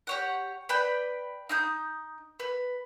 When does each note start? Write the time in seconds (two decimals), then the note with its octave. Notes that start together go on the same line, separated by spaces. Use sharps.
0.07 G4 C#5 F#5
0.69 B4 D5 G5 B5
1.49 D#4 D#6 G6
2.40 B4